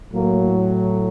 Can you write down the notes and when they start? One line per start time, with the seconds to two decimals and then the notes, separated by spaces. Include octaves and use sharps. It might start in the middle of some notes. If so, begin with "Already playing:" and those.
0.12 A2 F#3 A#3